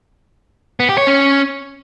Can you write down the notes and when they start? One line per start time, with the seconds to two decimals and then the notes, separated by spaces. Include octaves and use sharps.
0.80 B3
0.89 G4
0.98 C#5
1.07 C#4